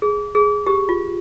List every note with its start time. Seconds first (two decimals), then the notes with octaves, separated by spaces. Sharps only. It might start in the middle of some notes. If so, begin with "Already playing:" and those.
0.02 G#4
0.35 G#4
0.67 G4
0.89 F4